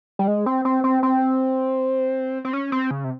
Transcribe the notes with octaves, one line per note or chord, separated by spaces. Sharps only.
G3
G#3
C4
C4
C4
C4
C4
C#4
C4
C#3
C3